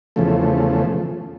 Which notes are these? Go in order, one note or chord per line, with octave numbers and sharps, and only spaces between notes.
E2 C#3 F3 A3